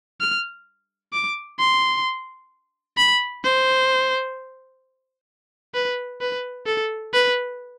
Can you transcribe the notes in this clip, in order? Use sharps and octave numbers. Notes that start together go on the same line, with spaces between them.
F6
D6
C6
B5
C5
B4
B4
A4
B4